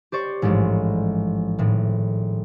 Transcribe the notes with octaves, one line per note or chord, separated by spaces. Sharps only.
G4 C5 D5 C#6
A1 G#2 F3 G#3
G#1 A2